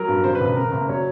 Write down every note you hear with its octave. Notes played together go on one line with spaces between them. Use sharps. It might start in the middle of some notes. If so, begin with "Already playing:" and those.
Already playing: F#3 A#4
G2
C#3 C5
B4
E1
B4
C#3 A#4
F#1
F#3 C#5